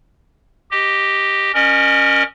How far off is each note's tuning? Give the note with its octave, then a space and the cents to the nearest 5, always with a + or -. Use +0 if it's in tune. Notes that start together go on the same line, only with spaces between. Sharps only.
G4 +0 D#5 +0
C#4 +0 A#4 +10 D#5 -40